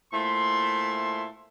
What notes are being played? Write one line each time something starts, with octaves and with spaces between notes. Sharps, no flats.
A#2 A3 E4 C5 C6